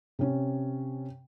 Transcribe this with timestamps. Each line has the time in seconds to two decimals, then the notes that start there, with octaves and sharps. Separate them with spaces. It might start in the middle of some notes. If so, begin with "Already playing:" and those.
0.19 C3 C#4